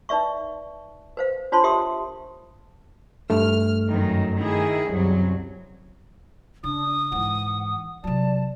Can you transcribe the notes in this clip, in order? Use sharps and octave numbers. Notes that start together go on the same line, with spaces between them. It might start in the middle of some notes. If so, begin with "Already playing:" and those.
D#4 B4 D5 E5 C#6
B4 C5 F5
D4 F4 C5 C#5 A5 C6
G4 A#4 E5 C6 D#6
G2 A3 F6
F#2 D#3 F#3
D#3 E4 G#4
C2 F#2 F#3
C#3 D4 D#6
G#2 E3 F#5
C3 F#3 D5 A5